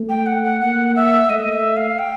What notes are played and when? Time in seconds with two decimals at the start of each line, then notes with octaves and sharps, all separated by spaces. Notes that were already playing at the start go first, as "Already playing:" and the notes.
Already playing: A3
0.09 G5
0.26 F#5
0.44 F#5
0.61 A#3 F#5
0.96 E5
1.30 A3 D#5
1.53 E5
1.77 F5
1.99 G5